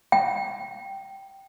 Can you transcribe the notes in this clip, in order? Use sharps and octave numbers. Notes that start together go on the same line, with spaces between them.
G5